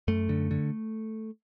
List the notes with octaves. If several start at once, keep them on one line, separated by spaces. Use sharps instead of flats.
F#2 A3
D3
D3